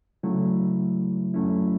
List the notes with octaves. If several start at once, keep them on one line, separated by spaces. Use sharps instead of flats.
C#3 F#3 A3 E4
F#2 F#3 A3 C#4 E4